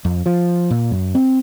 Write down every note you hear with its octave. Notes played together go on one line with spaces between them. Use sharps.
F2
F3
A#2
F#2
C4